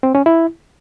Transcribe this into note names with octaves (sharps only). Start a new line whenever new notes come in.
C4
C#4
E4